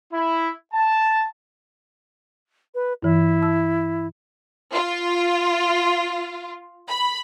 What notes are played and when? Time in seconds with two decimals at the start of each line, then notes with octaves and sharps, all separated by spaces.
0.13 E4
0.73 A5
2.75 B4
3.03 G2 E3 E4
3.42 A5 E6
4.72 F4
6.88 B5